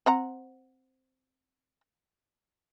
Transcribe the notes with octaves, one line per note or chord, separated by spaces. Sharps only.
C4 F#5 A#5